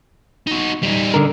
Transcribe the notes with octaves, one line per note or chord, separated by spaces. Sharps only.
D#4 F#4
G3 D#4
D3 A#4